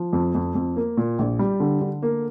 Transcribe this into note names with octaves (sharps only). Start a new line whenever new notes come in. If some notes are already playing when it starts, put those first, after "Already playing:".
Already playing: F3
F2
F2
F2
A#3
A#2
A#1
G3
D3
D3
A#3